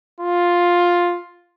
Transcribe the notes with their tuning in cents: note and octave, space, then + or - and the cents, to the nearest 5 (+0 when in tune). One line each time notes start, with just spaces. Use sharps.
F4 +5